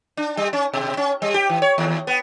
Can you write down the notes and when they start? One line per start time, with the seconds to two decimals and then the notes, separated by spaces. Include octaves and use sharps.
0.17 D4
0.37 G3
0.53 C#4
0.74 B2
0.97 C#4
1.22 G3
1.34 G4
1.50 E3
1.62 C#5
1.78 D#2
2.07 B3